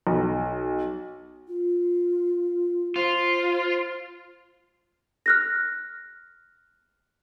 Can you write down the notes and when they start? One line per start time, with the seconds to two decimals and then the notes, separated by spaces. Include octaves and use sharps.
0.07 B1
1.48 F4
2.96 F4 C5
5.26 F6 F#6 A#6